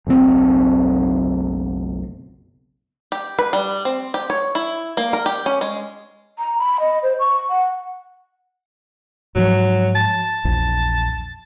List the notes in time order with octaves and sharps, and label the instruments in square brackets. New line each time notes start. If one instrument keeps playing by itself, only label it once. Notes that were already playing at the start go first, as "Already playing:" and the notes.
[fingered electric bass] F#1 B1 C#3 C4
[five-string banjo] G4
B4
G3
C4
G4
C#5
E4
A#3
A#4
G4
C#4
G#3
[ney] A#5
B5
D#5
C5
C#6
F#5
[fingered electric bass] G#2 F3 [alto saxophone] F#3
[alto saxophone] A5
[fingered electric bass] A#1 E2